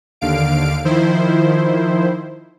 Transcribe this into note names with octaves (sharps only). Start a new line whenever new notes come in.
D#2 D3 F5 D7
D#3 F3 E4 C5